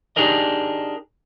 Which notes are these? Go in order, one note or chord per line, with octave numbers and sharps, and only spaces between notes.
D4 D#4 G4 G#4 A#4 D#5